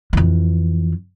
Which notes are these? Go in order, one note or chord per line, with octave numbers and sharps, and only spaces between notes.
F2 E3